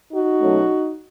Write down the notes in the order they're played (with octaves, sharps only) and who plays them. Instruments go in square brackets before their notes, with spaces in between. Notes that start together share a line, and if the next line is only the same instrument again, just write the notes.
[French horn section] D#4 F#4
B2 F#3 A3 C#4